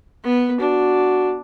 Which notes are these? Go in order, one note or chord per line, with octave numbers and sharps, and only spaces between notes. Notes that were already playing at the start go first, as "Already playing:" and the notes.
B3 B4
D4 F#4